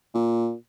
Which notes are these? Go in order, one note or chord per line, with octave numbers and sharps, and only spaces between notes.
A#2